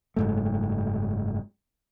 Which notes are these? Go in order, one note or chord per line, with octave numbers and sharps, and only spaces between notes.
F#1 G#2 A3